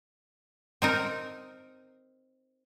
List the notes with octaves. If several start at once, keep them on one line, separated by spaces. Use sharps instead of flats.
C4 D#4 A#4